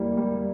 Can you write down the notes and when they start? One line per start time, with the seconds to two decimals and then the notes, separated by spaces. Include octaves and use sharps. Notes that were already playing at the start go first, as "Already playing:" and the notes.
Already playing: G3 A#3 E4
0.17 G3